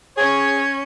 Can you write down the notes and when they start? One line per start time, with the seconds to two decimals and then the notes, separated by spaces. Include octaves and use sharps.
0.18 C#4 G#4 C#5 G#6